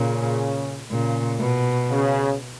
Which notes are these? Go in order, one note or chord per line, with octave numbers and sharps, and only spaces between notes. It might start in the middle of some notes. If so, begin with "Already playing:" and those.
Already playing: A#2 C#3
A#2 C#3
B2
C#3